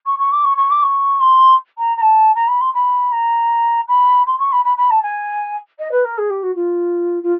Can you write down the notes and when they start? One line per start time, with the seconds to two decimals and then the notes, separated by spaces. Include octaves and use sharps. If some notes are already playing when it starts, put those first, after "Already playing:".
0.06 C#6
0.19 C#6
0.31 D6
0.44 C#6
0.57 C#6
0.70 D6
0.82 C#6
1.20 C6
1.78 A#5
1.97 A#5
2.01 A5
2.35 A#5
2.47 B5
2.60 C6
2.74 B5
3.12 A#5
3.88 B5
4.26 C6
4.39 C#6
4.52 B5
4.64 B5
4.77 B5
4.90 A5
5.02 G#5
5.79 D#5
5.91 B4
6.04 A#4
6.17 G#4
6.30 G4
6.43 F#4
6.55 F4
7.23 F4